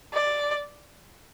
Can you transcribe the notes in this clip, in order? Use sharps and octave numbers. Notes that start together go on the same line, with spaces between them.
D5